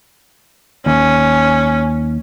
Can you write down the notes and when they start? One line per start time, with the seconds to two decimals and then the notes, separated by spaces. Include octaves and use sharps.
0.86 D#2 C#4